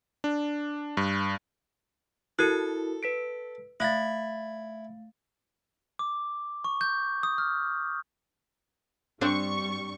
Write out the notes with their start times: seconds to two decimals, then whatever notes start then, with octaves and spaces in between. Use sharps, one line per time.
0.24 D4
0.97 G2
2.39 E4 F#4 A4 A#4
3.03 B4 B6 D7
3.80 A3 E4 F5 A6
5.99 D6
6.64 C#6
6.81 G6
7.23 D#6
7.38 F6
9.21 G2 G3 C4 D4 C#6